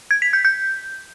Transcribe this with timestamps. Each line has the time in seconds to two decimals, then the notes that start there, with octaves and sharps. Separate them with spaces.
0.11 G#6
0.22 B6
0.33 G6
0.45 G6